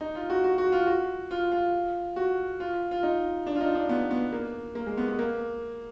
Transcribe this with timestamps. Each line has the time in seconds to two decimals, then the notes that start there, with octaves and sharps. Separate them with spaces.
0.01 D#4
0.15 F4
0.30 F#4
0.44 F#4
0.58 F#4
0.72 F4
0.87 F#4
1.31 F4
1.52 F4
2.16 F#4
2.60 F4
2.91 F4
3.03 D#4
3.47 D4
3.56 F4
3.61 D#4
3.75 D4
3.89 B3
4.11 B3
4.32 A#3
4.75 A#3
4.86 G#3
4.97 B3
5.08 B3
5.19 A#3